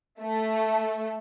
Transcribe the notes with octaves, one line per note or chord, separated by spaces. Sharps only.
A3